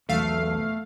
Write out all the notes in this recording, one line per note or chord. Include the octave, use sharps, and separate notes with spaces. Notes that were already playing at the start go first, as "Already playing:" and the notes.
B1 E2 A3 F5